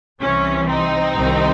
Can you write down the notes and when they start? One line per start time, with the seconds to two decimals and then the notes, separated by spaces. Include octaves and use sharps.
0.21 C2 C3 E3 C#4
0.68 C4 D#4
1.16 C2 C3 D#3